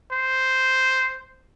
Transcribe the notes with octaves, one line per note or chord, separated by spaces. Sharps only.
C5